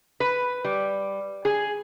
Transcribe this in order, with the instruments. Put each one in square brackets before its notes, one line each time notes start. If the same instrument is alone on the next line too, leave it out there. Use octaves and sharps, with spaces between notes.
[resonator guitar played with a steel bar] B4
G3
G#4